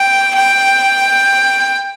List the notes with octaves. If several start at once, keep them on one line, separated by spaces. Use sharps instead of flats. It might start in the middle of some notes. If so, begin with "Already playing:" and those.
Already playing: G5
G5